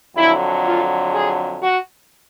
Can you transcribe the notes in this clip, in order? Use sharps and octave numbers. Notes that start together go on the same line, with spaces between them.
F2 D3 F#3 E4
F4
G#4
F#4